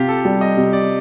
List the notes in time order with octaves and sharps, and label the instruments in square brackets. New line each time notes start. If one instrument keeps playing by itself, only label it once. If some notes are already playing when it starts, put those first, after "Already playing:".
Already playing: [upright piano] C3 [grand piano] F4 G4
[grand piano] A4
[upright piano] G3
[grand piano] D#5
[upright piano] C3
[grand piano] D5